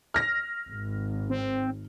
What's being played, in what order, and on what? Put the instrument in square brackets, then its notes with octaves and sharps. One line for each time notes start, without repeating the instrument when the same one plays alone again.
[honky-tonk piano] F6 A#6
[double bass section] G#1
[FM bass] C4